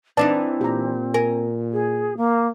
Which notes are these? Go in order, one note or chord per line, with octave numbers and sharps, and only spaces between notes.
E3 C4 D4 D#4 B4 D5 A5
A#2 G4 A#5
A#4 G#5
G#4
A#3